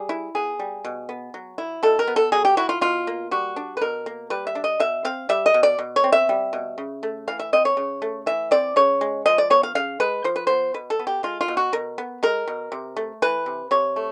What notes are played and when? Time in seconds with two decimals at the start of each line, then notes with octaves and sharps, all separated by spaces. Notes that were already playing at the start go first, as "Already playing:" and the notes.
Already playing: G3 G#4
0.09 E4
0.35 B3 G#4
0.59 G3
0.85 B2
1.09 B3
1.34 F#3
1.58 E4
1.83 B2 A4
1.99 A#4
2.08 B3
2.16 A4
2.32 F#3 G#4
2.45 G4
2.57 E4 F#4
2.69 F4
2.81 B2 F4
3.07 A#3
3.31 G3 F#4
3.56 D4
3.77 B4
3.81 B2 A#4
4.06 A#3
4.30 G3 B4
4.47 E5
4.55 D4
4.64 D#5
4.80 B2 E5
5.05 C4 F5
5.29 G3 E5
5.46 D#5
5.54 B2
5.63 D5
5.79 B2
5.96 C#5
6.04 C4
6.12 E5
6.29 G3
6.53 B2
6.78 C#3
7.03 A3
7.28 E3 F5
7.39 E5
7.53 C4 D#5
7.65 C#5
7.77 C#3
8.02 A3
8.26 E3 E5
8.51 C4 D5
8.76 C#3 C#5
9.01 G#3
9.26 F3 D#5
9.38 D5
9.50 B3 C#5
9.63 F5
9.75 C#3 F5
10.00 G#3 B4
10.24 F3 C5
10.36 B4
10.47 B3 C5
10.74 B2 B4
10.90 A4
10.99 B3
11.07 G4
11.23 G#3 F4
11.41 F4
11.48 B2
11.57 F#4
11.73 B2 A#4
11.98 B3
12.23 G#3 A#4
12.48 B2
12.72 C3
12.97 A3
13.22 E3 B4
13.46 C3
13.71 C3 C#5
13.96 A3